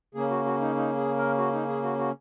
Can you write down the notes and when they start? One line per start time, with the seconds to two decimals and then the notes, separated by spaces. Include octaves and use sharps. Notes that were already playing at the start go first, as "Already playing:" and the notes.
0.14 C#3 A#3 C#4 G#4
0.30 F#4
0.45 F#4
0.61 D#4
0.76 D#4
0.96 G#4
1.17 A#4
1.38 F#4
1.53 D#4
1.68 G#4
1.83 F#4
1.99 F#4